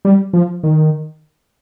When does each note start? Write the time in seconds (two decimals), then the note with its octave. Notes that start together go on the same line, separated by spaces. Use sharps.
0.05 G3
0.33 F3
0.64 D#3